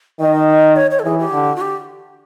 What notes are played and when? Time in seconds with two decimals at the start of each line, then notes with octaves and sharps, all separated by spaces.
0.20 D#3 D#5
0.76 C#5
0.91 C#5
0.99 A4
1.05 E3 G#4
1.18 G4
1.33 D3
1.56 F#4
1.61 G4